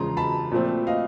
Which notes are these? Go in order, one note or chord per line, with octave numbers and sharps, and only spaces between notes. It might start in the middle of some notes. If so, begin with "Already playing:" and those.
Already playing: E2 C#3 F3 G#3 A#5 C6
A5 B5
A#2 F3 A3 C4
D#5 F5